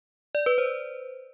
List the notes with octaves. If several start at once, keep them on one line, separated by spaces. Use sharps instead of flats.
D5
B4
C5